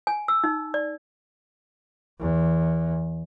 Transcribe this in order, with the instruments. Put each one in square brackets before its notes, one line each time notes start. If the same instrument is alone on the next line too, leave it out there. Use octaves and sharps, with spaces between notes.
[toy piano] G#5
E6
D#4
D5
[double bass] E2